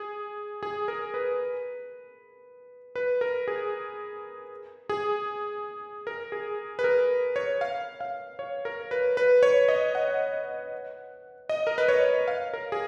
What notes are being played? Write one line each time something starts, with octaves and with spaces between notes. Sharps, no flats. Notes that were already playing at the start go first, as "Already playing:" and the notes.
Already playing: G#4
G#4
A#4
B4
B4
A#4
G#4
G#4
A#4
G#4
B4
A#4
C#5
F5
F5
C#5
A#4
B4
B4
C#5
D#5
F#5
D#5
A#4
B4
C#5
F5
A#4
G#4